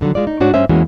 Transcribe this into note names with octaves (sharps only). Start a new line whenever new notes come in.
A2 D3 D#3 F#3
G#3 F4 D5
D#4
G#2 D4 F#4 C#5 D5
G2 C#4 C5 E5 G#5
E2 E3 G#3 A#3 C#4 F#4